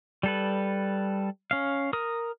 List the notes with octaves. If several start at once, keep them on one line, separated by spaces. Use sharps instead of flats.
G3 A4 B4
C#4 F5
A#4 D#6